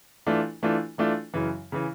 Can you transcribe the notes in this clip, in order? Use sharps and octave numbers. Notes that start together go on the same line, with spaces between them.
E3 A3 D4 F4
E3 A3 D4 F4
E3 A3 D4 F4
F#2 C#3 E3
C#3 E3